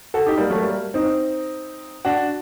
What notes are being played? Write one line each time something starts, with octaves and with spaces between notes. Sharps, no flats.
F#4 A4
D#4 G4
G3 A#3
F#3 A3
G3 A#3
C4 D#4
D4 F#4